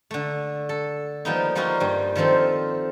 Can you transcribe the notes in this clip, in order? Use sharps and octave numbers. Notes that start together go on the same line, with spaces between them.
D3 A3
A4
F3 G3 A#3 B3 D#4
F3 G3 D#4 F4 F#4
G2 G3
D#3 F3 C4 A4 C5